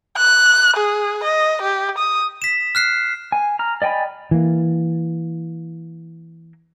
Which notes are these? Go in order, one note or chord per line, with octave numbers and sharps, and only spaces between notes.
F#6
G#4
D#5
G4
D#6
B6 E7
F6 F#6 C7
G#5
A#5 F6
D5 D#5 G5 G#5 B5
E3 A#3